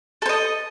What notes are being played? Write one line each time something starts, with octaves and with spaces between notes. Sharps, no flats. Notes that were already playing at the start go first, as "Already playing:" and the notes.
A4 C5 D#5